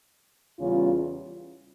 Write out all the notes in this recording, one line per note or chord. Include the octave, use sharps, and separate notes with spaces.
E2 C#3 G3 C#4 F4